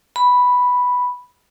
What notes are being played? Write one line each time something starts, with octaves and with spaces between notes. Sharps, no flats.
B5